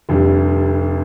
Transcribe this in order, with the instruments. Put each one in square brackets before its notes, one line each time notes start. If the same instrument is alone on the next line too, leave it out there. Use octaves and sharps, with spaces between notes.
[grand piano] F1 F2 D3 G3